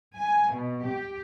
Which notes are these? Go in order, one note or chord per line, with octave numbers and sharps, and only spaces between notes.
G#5
B2
G4